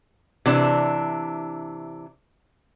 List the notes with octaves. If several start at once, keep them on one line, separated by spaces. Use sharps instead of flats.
C3 E3 D4